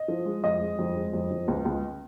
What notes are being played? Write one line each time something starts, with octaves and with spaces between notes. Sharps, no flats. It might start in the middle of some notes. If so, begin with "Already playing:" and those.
Already playing: D#5
F3
G#3
F2 D#5
G#3
F2
G#3
F2
F2
C#2
C#2